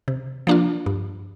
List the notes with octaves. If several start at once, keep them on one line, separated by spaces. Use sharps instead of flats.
C3
F3 A#3 D4 F4
G2